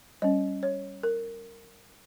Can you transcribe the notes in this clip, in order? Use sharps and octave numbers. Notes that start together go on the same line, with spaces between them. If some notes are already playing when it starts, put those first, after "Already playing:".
G3 C#4 D#5
C#5
A#4